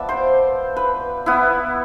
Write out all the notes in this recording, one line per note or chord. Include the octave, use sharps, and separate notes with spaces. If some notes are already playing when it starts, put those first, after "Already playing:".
Already playing: F3 B3 D5 E5 A5
C5
B4
B3 E4